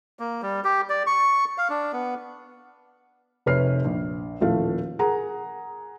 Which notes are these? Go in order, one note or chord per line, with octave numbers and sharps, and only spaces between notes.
A#3
G3
G4
D5
C#6
F5
D4
B3
F1 C3 B4 C#5 F6 C7
A#1
D#1 A2 F3 A3 F5
G#4 A#4 F#5 A#5